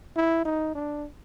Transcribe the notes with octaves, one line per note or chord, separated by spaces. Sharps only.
E4
D#4
D4